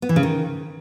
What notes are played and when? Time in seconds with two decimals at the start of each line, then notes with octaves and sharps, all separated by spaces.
0.02 B3
0.09 E3
0.16 C#3
0.23 D#3